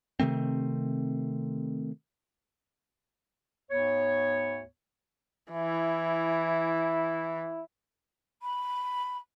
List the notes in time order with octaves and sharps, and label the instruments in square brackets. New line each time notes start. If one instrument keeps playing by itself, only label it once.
[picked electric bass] C3 D#3 A3 C4
[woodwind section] D2 G#2 B3 C#5
[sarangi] E3 [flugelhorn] E4
[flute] B5